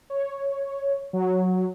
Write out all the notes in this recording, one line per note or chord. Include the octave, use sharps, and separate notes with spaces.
C#5
F#3